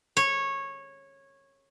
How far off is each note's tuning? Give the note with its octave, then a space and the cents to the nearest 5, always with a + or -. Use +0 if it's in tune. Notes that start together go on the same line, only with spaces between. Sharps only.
C#5 -15